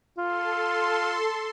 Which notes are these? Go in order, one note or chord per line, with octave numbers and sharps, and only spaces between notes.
F4 A4 C6